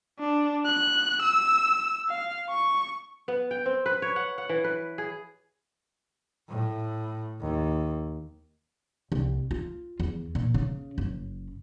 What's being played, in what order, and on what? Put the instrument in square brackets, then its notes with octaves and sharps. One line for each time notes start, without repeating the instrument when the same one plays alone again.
[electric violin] D4
F#6
E6
F5
C#6
[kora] B3
G5
C4
B4
C#5
F#5
F#5
E3
B4
G#4
[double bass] A2
D#2
[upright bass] C2
F4
E2
A#2
C#3
F#1